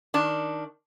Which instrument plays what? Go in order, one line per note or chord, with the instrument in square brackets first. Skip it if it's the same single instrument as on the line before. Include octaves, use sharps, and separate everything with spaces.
[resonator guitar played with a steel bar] D#3 D4